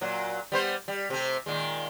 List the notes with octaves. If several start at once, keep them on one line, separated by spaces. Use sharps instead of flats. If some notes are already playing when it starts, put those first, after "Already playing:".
A#2 F#3
G3 B3 C5
G3
C3 A3 C4
A#2 D#3 G#3